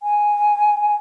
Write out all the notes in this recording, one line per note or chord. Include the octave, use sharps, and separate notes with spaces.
G#5